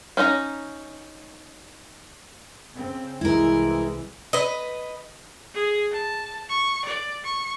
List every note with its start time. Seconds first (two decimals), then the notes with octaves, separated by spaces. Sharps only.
0.17 C#4 D#4 F4 A#5
2.75 C#3 C4
3.21 C2 E3 G#3 E4 A#4
4.33 B4 D#5
5.54 G#4
5.92 A5
6.49 C#6
6.85 D5
7.24 C#6